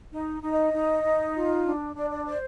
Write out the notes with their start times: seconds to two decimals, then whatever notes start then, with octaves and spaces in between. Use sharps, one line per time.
0.12 D#4
0.42 D#4
0.52 D#5
0.73 D#4
1.04 D#4
1.35 F4
1.65 D4
1.95 D4 D5
2.11 D5
2.26 C5 D5